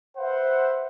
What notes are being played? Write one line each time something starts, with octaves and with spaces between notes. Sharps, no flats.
B4 C5 E5 F#5